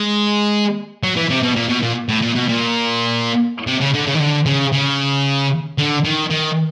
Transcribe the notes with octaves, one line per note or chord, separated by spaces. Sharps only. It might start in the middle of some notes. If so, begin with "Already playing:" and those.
Already playing: G#3
F#3
E3
C3
B2
A#2
B2
A#2
A2
A#2
B2
A#2
C3
C#3
D3
C#3
D#3
D3
C#3
C#3
D3
D#3
D#3